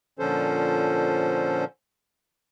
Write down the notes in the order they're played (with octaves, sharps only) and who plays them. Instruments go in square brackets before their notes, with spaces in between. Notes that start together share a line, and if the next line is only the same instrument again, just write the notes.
[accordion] A#2 D3 F3 C#4 A4 C5